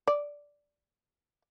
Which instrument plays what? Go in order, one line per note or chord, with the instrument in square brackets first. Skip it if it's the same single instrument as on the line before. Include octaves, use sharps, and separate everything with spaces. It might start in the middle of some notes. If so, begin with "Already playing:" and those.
[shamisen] D5